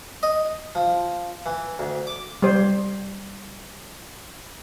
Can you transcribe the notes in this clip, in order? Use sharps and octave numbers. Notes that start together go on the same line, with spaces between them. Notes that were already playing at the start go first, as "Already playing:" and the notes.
D#5
F3
E3
D2
D6
G3 C5